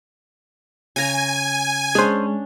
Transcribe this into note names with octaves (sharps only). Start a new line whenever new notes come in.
C#3 G#5 A#5
G#3 C#4 D4 G#4 C5